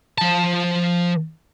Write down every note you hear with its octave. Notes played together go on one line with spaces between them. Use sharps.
F3 A5